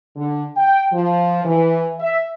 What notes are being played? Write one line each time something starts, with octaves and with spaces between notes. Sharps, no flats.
D3
G5
F3
E3
E5